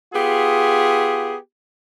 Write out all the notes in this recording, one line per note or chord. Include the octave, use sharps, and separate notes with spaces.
B3 F4 G4 G#4